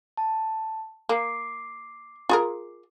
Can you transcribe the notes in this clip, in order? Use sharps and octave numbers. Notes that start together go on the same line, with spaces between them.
A5
A#3 D6 C7
F4 G#4 A#4